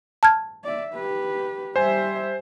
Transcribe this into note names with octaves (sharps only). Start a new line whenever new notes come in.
A5 F6 G#6
D5 E5
G4 B4
G3 C5 E5 G#5